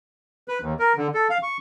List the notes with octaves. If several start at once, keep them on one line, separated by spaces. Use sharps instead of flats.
B4
D#2
A#4
D3
A4
F5
C#6